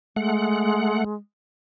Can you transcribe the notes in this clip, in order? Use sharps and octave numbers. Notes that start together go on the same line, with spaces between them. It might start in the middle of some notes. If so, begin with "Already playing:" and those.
G#3 A3 F#5